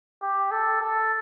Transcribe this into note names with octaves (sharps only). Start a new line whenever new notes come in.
G4
A4
A4